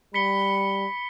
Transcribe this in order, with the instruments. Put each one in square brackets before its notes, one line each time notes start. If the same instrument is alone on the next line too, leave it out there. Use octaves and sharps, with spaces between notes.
[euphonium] G3 [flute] B5 [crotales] B6 C#7 G7